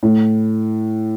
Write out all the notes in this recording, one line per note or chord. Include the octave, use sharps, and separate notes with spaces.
A2